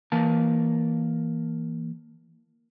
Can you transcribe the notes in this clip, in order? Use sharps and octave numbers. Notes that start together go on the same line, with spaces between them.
E3 A#3 A#4 A5